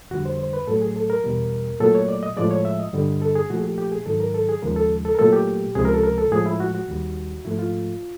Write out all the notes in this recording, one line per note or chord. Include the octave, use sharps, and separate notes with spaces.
F2 D3 G3 F#4
C5
C5
B4
A2 F#3 A3 A4
G#4
A4
A#4
E2 B2 G3
A#2 F#3 A3 A4
C#5
D5
D#5
A2 F3 G#3 D5
C#5
E5
D#5
G2 D3 G3
A4
G#4
A#2 F3 A3 F#4
G#4
G4
G4
G#4
G#2 D#3 F#3 A4
A#4
A4
G#4
D#2 C#3 F3 G#3 A#4
A4
A4
A#4
A#2 F#3 A3 A4
G4
C#2 C3 F3 G#3 G#4
A#4
A4
A#4
A4
A2 F3 G#3 G#4
E4
F#4
F#4
D#2 D#3 G3
G#2 F3 A3 E4
F4